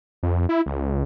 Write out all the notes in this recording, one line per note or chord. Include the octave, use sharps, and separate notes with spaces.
F2
E4
C#2